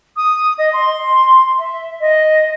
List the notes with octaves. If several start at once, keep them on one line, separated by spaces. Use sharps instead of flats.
D#6
D#5
C6
E5
D#5